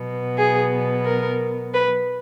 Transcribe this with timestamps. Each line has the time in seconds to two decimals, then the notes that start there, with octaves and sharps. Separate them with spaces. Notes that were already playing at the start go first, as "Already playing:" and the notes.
Already playing: B2 F#3 B3
0.38 G#4
1.05 A#4
1.74 B4